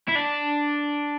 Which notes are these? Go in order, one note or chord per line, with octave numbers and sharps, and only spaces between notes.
E4
D4